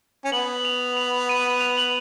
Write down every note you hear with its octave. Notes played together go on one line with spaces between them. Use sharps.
C#4
B3 F#7
F7
F7
D#7
F7
F#7